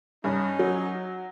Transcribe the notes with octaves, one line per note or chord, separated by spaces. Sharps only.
G2 C#4 D#4
F#3